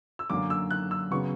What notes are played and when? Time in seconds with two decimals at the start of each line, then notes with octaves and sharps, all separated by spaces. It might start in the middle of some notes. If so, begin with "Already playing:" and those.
0.19 E6
0.30 F#2 D3 A#3 D6
0.50 E6
0.71 F#6
0.91 E6
1.11 F#2 C#3 F#3 B3 C#6